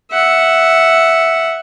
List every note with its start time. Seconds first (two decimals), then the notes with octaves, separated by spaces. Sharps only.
0.11 E5 F#5